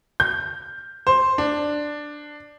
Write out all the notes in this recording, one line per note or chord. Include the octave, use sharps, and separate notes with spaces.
G6
C5
D4